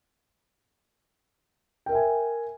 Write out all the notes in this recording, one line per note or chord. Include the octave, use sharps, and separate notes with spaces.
A#4 E5 G5 G#5